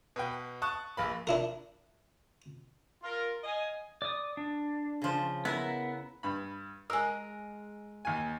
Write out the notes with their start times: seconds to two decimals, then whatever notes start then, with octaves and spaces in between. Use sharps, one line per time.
0.16 B2 B4 G5
0.62 A5 C#6 D#6 F#6
0.97 A#1 A#3 B5
1.27 D4 E4 A#4
3.03 F4 A#4
3.44 D#5 F5 G#5
4.02 D5 D#6
4.37 D4
5.02 C#3 F3
5.45 B3 E4 A#4
6.23 G2 B5
6.90 G#3 A#4 D#5 E6
8.05 D#2 G#5